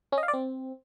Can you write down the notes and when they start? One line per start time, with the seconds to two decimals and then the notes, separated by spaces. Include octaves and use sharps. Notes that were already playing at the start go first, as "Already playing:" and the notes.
0.12 C#4
0.18 D#5
0.23 F5
0.28 D5
0.33 C4